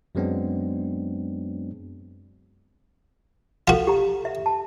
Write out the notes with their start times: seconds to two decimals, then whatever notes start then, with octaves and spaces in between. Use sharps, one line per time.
0.15 F#2 F#3 G#3 B3 C4 D4
3.68 F4 F#4 A4 F5
3.87 G4 A#5
4.25 E5
4.46 A5